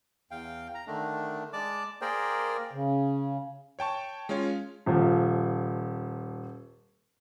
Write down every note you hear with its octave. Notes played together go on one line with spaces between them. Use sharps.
E2 F5 G5
A#5
D3 D#3 A3 D4
G#3 D5 A5 D6
A#3 G#4 A#4 C5 D5 G5
C#3
C#5 G5 A5 C#6
G#3 C#4 F4 C#5
D#1 F3